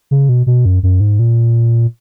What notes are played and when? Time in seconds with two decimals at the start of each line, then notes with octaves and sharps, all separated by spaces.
0.11 C#3
0.29 B2
0.47 B2
0.65 F#2
0.83 F#2
1.00 G#2
1.19 A#2